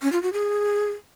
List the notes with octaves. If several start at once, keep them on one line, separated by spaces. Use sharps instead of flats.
C#4
F4
F#4
G#4